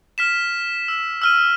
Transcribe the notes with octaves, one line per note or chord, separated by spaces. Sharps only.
F6 B6 E7
E6
E6 F6 D#7